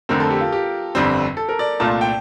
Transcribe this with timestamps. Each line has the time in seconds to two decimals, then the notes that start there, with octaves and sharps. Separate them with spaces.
0.09 F2 D3 A3 C4 A#4
0.20 A4
0.30 G4
0.41 F4
0.52 G4
0.95 G1 F2 D3 G3 C4
1.37 A4
1.49 A#4
1.59 D5
1.80 C2 A#2 A3 D4 F4 A5
1.91 A5
2.01 G5